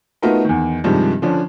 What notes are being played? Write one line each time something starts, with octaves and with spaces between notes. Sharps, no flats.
A3 B3 D#4 F4 F#4 A#4
E2 D#3
G2 C3 D#3 F3 G3 G#3
D3 F3 C#4 D4